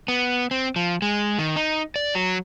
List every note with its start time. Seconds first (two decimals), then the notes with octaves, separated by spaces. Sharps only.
0.08 B3
0.51 C4
0.76 F3
1.02 G#3
1.39 D#3
1.56 D#4
1.96 D5
2.15 F#3